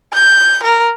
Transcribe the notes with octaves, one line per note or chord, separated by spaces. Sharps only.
G6
A#4